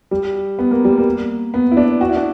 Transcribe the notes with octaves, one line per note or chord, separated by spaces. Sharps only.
G3
B3
A#3
G3
A#3
B3
E4
D4
F#4
E4
D4